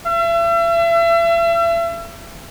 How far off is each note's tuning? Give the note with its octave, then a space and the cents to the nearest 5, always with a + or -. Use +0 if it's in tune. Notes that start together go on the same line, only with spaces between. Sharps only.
E5 +40